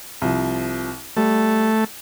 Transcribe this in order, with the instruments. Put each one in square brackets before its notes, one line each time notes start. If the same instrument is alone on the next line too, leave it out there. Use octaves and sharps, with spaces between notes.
[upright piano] C2 F3
[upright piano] G3 [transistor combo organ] A3